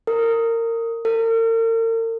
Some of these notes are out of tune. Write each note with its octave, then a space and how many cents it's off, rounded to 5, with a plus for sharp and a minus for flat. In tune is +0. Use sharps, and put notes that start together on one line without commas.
A#4 -25
A#4 -45